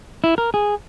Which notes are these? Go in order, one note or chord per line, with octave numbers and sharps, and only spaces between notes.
E4
A#4
G#4